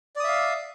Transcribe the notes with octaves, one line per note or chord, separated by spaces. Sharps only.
D5 E5 F5 D#6